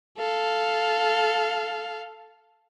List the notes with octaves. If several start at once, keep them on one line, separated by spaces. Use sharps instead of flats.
A4 F5